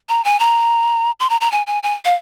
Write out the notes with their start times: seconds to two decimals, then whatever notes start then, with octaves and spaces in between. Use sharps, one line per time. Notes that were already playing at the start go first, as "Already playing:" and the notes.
0.09 A#5
0.25 G#5
0.40 A#5
1.20 C6
1.30 A#5
1.41 A#5
1.52 G#5
1.67 G#5
1.83 G#5
2.05 F5